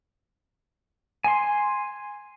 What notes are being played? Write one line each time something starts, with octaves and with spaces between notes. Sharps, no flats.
G#5 C6